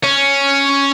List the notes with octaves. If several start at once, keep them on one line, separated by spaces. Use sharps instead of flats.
C#4